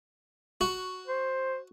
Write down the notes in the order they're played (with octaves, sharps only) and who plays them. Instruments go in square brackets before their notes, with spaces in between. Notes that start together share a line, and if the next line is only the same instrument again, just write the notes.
[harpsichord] F#4
[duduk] C5